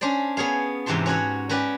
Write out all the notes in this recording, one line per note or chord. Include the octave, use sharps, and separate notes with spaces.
C#4 D4 C5 D5
B3 G#4 C#5 F5
G#2 C3 E3 G4 A5 C6
C#4 F#4 C#5 F#5
C#4 F#4 B4 D5 G5